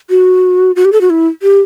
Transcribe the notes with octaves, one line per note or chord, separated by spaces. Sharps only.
F#4
F#4
G4
A4
F#4
E4
G4